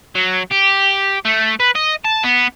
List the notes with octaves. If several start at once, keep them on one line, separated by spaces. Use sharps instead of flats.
F#3
G4
A3
B4
D#5
A5
B3